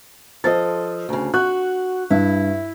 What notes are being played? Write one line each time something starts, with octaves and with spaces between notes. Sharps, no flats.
F3 A4 D#5 A6
D2 C#3
F#4 F#6
G2 E4